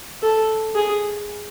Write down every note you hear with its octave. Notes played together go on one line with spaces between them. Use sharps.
A4
G#4